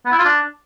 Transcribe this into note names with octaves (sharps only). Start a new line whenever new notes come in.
B3
E4
F4
D4